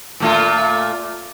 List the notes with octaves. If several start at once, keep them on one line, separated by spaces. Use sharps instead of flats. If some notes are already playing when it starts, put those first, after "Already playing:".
A#2 A3 F4